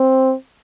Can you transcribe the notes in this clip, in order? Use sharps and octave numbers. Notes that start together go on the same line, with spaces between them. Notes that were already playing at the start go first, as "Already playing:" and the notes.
Already playing: C4